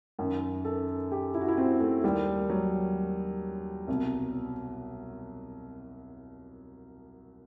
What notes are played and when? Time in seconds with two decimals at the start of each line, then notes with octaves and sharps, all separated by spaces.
0.19 F#2 D#3
0.65 A4
1.11 G4
1.34 E4
1.41 F#4
1.48 E4
1.58 C4
1.80 A3
2.04 D#2 D#3 G3
2.49 F#3
3.88 C2 B2